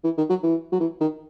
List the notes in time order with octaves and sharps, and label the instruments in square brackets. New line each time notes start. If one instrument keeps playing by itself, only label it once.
[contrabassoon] E3
D#3
F#3
E3
F#3
E3
D#3